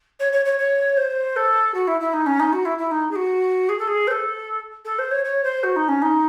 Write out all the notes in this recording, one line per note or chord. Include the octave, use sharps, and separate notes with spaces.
C#5
C#5
C#5
C#5
C5
A4
F#4
E4
E4
D#4
C#4
D#4
F#4
E4
E4
D#4
G#4
F#4
G#4
A4
G#4
C5
A4
A4
C5
C#5
C#5
C5
F#4
D#4
C#4
D#4